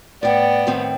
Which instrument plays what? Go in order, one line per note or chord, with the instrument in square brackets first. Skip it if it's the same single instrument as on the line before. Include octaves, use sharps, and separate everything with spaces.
[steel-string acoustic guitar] A2 G5 [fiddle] B3 [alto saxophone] D5
[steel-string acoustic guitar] A2 D#3 C4